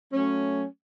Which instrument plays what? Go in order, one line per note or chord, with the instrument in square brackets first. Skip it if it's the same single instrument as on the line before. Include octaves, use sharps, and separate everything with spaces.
[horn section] F#3 A3 C#4